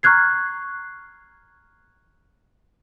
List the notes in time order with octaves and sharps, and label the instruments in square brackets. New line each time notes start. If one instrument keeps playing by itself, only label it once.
[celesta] A#5 C#6 F6 F#6 G#6 C7